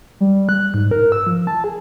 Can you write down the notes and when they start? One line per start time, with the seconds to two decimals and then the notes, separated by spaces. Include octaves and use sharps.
0.21 G3
0.49 F#6
0.74 G#2
0.91 A#4
1.12 E6
1.27 F3
1.47 A5
1.64 G#4